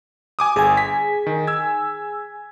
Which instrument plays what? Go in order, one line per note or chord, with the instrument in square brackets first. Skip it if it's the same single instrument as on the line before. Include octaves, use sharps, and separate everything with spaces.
[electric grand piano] G#5 D6 D#6
[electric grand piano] G1 [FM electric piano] G#4 G#5
[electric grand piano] B6
D#3
E6 G#6